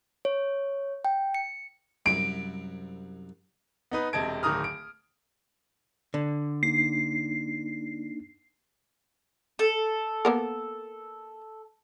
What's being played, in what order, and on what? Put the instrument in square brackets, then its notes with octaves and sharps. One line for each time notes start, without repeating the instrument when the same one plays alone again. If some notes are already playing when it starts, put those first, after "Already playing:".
[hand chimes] C#5
G5
C#7
[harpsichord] C2 F#2 [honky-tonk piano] D7
[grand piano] B3 D#4 B4
E1 C3 D#5 A5 G#6 D7
D1 D#3 A#5 D#6 F6
D7
[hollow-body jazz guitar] D3
[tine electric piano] A#3 D4 D#4 [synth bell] C7
[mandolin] A4
[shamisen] A#3 B3 A#4